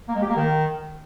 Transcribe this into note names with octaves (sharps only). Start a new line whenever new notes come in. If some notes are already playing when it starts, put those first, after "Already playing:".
A#3
G#3
G4
A#3
D#3